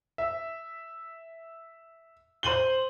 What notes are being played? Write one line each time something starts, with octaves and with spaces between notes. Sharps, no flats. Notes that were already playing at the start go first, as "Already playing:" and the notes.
E5
C5 C6 D#7 F#7 G7